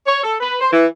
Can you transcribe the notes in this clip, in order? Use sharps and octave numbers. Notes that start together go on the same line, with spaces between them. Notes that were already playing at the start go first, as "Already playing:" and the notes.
C#5
A4
B4
C5
E3